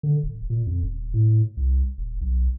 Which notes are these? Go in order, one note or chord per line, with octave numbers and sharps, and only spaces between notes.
D3
D1
A#2
F2
D#1
A2
C2
D#1
B1